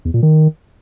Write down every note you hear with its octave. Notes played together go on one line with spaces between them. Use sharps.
E2
A#2
D#3